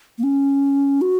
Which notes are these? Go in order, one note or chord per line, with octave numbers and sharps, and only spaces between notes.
A#3
C#4
F#4